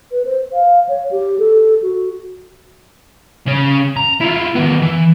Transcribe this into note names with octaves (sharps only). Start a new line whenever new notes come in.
B4
C5
F5
C#5
G4
A4
F#4
C#3 C#4
A#5
E4 F4
D#3 B3
E3